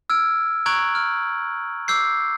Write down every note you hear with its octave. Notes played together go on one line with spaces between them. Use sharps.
E6 F6 G#6 D7
A#5 C#6 F#6 G#6 D7 F#7
F6
D6 E6 G6 C7